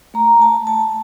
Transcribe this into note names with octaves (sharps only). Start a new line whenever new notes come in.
A3 A#5
A3 A5
A3 A5